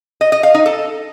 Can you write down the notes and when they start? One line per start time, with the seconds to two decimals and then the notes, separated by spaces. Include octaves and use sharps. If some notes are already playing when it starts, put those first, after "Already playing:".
0.21 D#5
0.32 D#5
0.43 F5
0.54 D#4
0.66 A4